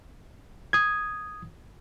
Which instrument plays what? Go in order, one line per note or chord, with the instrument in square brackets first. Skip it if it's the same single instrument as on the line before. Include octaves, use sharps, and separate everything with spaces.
[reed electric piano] D#6 G#6